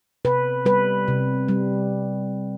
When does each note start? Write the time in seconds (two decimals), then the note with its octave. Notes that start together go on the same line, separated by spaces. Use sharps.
0.25 C3 B4
0.65 G3 B4
1.08 C3
1.48 G3